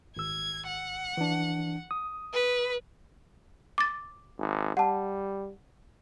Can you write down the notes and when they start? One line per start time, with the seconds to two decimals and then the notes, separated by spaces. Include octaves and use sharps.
0.17 G#1 E6 G#6
0.67 F#5
1.17 E3 D4
1.91 D#6
2.33 B4
3.78 D6 A6
4.38 G#1
4.77 G3 F#5 A5